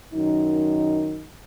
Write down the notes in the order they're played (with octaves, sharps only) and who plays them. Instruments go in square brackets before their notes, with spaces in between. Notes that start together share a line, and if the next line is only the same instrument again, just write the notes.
[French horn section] F#2 D#3 D#4